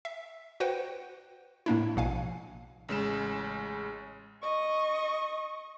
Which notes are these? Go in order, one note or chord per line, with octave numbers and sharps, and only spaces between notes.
E5
F#4 B4 C5 F#5 G5
A2 A#3 D4 E4
A#1 B2 F5 G#5
A1 C#3 G#3 E7
D#5 C#6